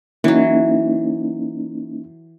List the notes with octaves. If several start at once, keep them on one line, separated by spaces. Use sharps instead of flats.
E3 F#3 A#3 C#4 D#4